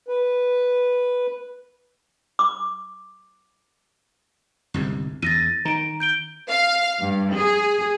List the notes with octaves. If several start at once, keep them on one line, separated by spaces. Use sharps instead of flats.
B4
D6
G1 C2 G#2
E2 A6 A#6 D#7
D#3 A#5 D7
G6 D7 G7
F5
G2
G#4